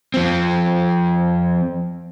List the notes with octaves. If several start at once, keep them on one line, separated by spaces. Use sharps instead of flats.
F3 C4